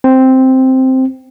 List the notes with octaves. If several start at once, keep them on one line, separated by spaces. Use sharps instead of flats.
C4